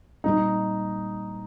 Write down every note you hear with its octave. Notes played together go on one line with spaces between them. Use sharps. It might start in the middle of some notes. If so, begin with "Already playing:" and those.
A#2 G3 C4 D#4